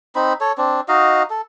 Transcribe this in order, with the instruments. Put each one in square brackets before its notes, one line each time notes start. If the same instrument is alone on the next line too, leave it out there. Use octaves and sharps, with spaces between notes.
[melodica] C4 D#4 B5
A4 C#5
C4 D4
D#4 F#4 D#5 F5
A4